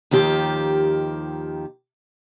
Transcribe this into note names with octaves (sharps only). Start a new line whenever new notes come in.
D#2 D#3 F3 G4